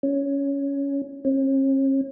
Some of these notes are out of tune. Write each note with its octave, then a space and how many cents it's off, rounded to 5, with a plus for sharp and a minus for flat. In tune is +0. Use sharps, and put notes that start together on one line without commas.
C#4 +10
C#4 -45